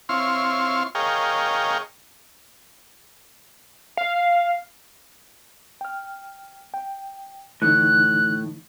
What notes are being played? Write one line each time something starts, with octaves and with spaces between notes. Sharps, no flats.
C4 E4 C#5 F5 C6
G#4 A#4 C#5 D#5 F5 G5
F5
G5 F6
G5
A2 D3 E3 D#4 F#6